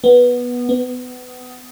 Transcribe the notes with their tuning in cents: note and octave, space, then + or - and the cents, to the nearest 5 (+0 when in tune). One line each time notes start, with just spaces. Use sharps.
B3 -10
B3 +25